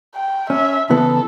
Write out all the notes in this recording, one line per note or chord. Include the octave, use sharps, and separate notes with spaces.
G5
C#4 E5
C#3 E3 B3 A4